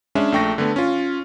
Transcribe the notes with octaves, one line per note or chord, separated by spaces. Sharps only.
G#3 C#4 D4 E5
A#1 A3 G5 C#6 A#6
D3 A3 B3
C#4 F4